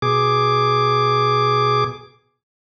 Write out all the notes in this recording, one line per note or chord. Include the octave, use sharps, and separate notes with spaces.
B2 G#4 D6